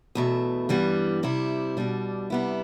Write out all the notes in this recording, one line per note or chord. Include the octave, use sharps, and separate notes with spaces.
E2 B2 A3
G2 E3 G3 B3
C3 G3 C4 E4
B2 G3 D4
C3 G3 B3 E4